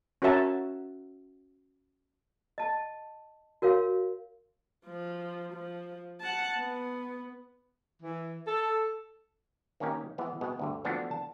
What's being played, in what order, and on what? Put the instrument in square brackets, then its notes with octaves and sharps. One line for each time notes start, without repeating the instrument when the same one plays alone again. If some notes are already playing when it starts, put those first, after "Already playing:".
[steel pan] C#4 F#4 A#4 C#5 E5 A5
[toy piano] D#5 A5
F#4 A#4 C#5 F5
[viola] F3
F3
F#5 A5
B3
[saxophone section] E3
A4
[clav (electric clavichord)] D#3 A#3 C#4 D#4 G4
E3 G#3 B3
B2 G#3 B3
D2 G2 D3
E3 F3 A3 B3 D4 F#4
A5